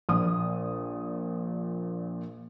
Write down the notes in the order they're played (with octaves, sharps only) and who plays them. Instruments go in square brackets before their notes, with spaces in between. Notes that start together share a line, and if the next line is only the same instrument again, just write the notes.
[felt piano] A#1 A#2 D#6